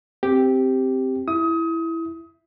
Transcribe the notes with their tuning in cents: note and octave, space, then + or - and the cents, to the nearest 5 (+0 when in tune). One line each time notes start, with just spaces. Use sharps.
C4 +0 G4 +0
E4 +0 D#6 +25